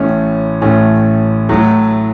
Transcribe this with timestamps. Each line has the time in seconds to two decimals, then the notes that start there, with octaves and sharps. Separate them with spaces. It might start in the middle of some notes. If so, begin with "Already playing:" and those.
Already playing: A1 A2 A3 C#4
0.61 A1 A2 A3 C#4
1.49 A2 F#3 A3